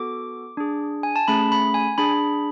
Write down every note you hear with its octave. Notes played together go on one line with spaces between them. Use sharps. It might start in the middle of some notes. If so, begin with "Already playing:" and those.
Already playing: B3 F#4 A4 D6
D4 G#4
G#5
A5
A3 C#4 G#4 B5
B5
G#5
D4 G#4 B5